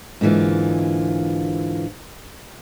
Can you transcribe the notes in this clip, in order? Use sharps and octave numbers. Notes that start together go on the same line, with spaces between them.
G#2 D3 E3 A#3 F4